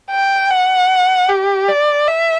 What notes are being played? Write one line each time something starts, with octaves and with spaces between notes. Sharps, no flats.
G5
F#5
G4
D5
E5